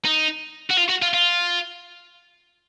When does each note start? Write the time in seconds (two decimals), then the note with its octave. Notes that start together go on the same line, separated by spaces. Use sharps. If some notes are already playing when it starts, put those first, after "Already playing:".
0.05 D#4
0.71 F#4
0.78 F4
0.89 F#4
1.02 F4
1.14 F4